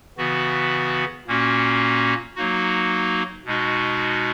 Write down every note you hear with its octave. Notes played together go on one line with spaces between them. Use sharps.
C#3 E3 B3 F#4
A#2 A#3 C#4 F#4
F#3 A#3 D#4 F#4
B2 G#3 D#4 F#4